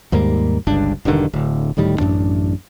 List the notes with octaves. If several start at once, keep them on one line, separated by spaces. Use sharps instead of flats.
D#2 G#2 G3 A#3
G1 C#2 G2 D4
E1 G2 D3 D#3
D1 D2
D1 A2 D#3 G3
A1 F#2 C3 D4